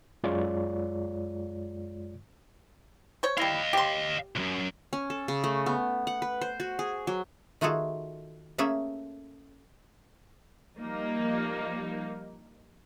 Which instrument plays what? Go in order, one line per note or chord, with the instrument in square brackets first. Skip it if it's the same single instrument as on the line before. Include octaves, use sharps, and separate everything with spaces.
[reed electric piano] F#2 G#3 F4 C#5 D5
[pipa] C5 C#5
[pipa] G3 E4 [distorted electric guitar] D#5 F5
[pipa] G4 C6
[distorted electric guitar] C2 F#2
[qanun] C#4
A4
C#3
A3
B3
F#5
B4
C5
F#4
G#4
F#3
[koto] D#3 A3 F4 F#4 G#4 A4
A3 A#3 C#4 G#4 A4 E5
[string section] F3 G3 A#3 D#4